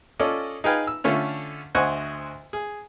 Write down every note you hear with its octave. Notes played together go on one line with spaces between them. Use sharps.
C#4 F4 A4 D5 D#5
D#4 G#4 B4 F5 G5 G#5
E6
D3 A3 C#4 F4
D2 C5 D#5 F#5 G#5 C#6
G#4